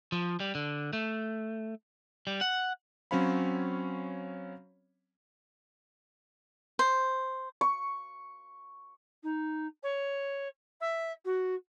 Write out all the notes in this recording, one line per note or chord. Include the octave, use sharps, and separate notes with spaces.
F3
G3
D3
A3
G3
F#5
F#3 C4 C#4 C#5 F5 B5
C5
C#6
D#4
C#5
E5
F#4